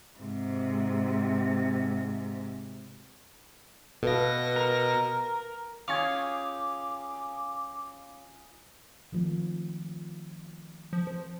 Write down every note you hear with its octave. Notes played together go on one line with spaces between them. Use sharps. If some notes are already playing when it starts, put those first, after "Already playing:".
G#2 C3
B2 A4 B4 F5 A#6
A#4
C#4 F4 G#4 F5 G5 C#6 D6 G#6
D#3 F3 A3
F3
C5